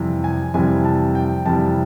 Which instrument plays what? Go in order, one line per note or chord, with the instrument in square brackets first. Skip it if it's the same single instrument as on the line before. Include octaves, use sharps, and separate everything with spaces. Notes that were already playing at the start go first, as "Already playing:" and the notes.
Already playing: [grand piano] F2 C3 E3 G3
G#5
F2 C3 E3 G3 G#5
A5
G5
F2 C3 E3 G3 A5